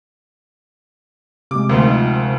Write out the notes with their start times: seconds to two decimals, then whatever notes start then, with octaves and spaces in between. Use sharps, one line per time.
1.51 C3 G#3 D6
1.69 D2 D#3 F3 F4